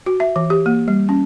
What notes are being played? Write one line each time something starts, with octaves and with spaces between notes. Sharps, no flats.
F#4
E5
E3
G4
A#3
G3
C#4